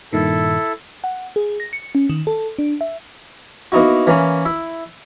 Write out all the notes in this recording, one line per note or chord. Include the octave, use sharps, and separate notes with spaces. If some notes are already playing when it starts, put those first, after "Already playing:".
G2 A#2 D#3 E4 A4
F#5
G#4
A#6
C#7
C#4
D#3
A4
D4
E5
A#3 B3 D#4 E4 F#4
E3 A#3 C#4 B5
E4 E5